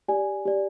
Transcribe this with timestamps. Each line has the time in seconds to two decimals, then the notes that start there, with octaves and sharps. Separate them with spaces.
0.08 G4 D5 G#5
0.45 G4 D5